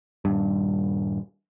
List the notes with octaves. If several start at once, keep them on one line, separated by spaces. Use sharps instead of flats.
D#1 G2